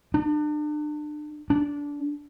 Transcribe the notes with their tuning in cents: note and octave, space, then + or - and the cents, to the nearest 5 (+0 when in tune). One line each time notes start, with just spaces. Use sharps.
D4 +35
D4 -20